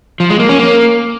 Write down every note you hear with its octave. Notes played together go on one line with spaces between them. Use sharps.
F3
G#3
A#3
C#4
A#3